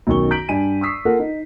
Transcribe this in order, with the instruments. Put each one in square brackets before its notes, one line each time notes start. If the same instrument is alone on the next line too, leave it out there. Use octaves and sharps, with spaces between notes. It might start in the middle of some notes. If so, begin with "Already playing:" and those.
[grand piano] B1 F#2 D#3 C#6 G7
A#5 G6 B6 D7 F#7
G2 G#5 D#7
C#6 D#6 E6 B6 C7
A#3 F4 A4 A#4 F#5
D#4